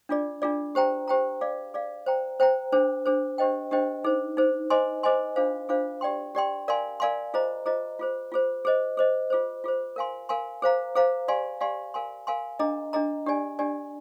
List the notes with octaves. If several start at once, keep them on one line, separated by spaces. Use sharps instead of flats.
D4 F4 G#4 D5
D4 F4 G#4 D5
G4 C5 G5 A#5
G4 C5 G5 A#5
G#4 D5 F5
G#4 D5 F5
C5 G5 A#5
C5 G5 A#5
D4 G#4 C5
D4 G#4 C5
D4 G4 C5 D#5 G5
D4 G4 C5 D#5 G5
D#4 G#4 C5
D#4 G#4 C5
G#4 C5 D#5 G#5 C6
G#4 C5 D#5 G#5 C6
D4 F4 G#4 C5 F5
D4 F4 G#4 C5 F5
G4 D5 G5 C6
G4 D5 G5 C6
A#4 D5 F5 G#5 C6
A#4 D5 F5 G#5 C6
F4 G#4 C5 D#5 A#5
F4 G#4 C5 D#5 A#5
F4 G#4 C5
F4 G#4 C5
G#4 C5 D#5
G#4 C5 D#5
F4 G#4 C5
F4 G#4 C5
A#4 F5 G#5 C6
A#4 F5 G#5 C6
G#4 C5 F5 A#5
G#4 C5 F5 A#5
G4 D5 F5 G#5 C6
G4 D5 F5 G#5 C6
A#4 F5 G#5 C6
A#4 F5 G#5 C6
D4 G#4 D#5 A#5
D4 G#4 D#5 A#5
D4 G4 D5 G#5
D4 G4 D5 G#5